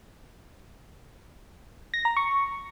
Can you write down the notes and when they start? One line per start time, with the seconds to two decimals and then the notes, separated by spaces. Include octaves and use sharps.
1.94 A#6
2.05 A#5
2.17 C#6